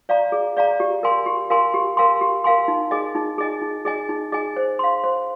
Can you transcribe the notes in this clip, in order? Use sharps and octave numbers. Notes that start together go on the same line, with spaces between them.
D5 F5 A#5
G#4
D5 F5 A#5
G4
A#4 F5 G#5 C6
G4
A#4 F5 G#5 C6
G4
A#4 F5 G#5 C6
G4
A#4 F5 G#5 C6
D#4
G#4 D#5 G#5
D#4
G#4 D#5 G#5
D#4
G#4 D#5 G#5
D#4
G#4 D#5 G#5
C5
F5 C6
C5